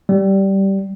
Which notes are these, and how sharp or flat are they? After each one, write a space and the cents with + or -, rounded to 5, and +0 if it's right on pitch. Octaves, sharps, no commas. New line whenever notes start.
G3 -10